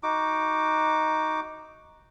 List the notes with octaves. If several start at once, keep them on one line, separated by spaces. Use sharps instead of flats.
D#4 F#4 D6